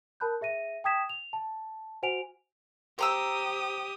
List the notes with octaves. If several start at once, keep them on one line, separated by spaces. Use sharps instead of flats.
A#4 A5 B5 F#6 G6
G#4 E5 A#6 D#7
G5 A5 D#6 G#6 B6 E7
F7
A5
F#4 C5 F#5 G#5 D7 F7
G4 C5 A#5 D#6 E6